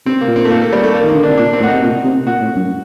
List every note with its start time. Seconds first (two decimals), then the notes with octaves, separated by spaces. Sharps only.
0.06 C3 C4
0.21 A#3
0.28 A#2
0.36 C4
0.45 A3
0.50 A#3
0.62 A3
0.73 G3
0.84 A3
0.94 A#3
1.03 D#3
1.09 A#3
1.14 D3
1.23 C3 D4
1.38 A#2 D4
1.53 C4
1.60 A2
1.63 F#4
1.67 D#4
1.73 C3
1.82 A#2
2.04 C3
2.26 A#2 F#4
2.41 A2
2.56 F#2